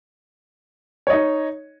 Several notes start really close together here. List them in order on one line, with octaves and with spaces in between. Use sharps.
C#5 D#5 D#4